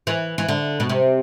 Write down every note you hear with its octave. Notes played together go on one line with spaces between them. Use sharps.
E3
E3
D3
B2
C3